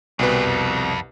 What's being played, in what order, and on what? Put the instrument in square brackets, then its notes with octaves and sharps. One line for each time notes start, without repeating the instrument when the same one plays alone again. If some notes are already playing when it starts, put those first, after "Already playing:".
[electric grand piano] C2 B2 B4 [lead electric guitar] C4 G#4
[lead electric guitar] F2